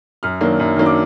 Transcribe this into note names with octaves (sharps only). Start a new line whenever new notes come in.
F#2 F6
D#3 F#3 A#3 D4
F#2
D#3 F#3 A#3 D4
D6